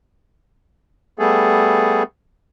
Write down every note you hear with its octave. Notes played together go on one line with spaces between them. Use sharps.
G3 A3 B3 G#4 A4